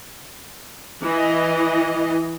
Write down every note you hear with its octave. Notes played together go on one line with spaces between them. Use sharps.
E3 D#5